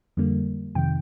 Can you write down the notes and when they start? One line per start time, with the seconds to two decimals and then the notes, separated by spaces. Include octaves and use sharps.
0.17 F2 D3 G3 A#3
0.75 F2 C3 D#3 G5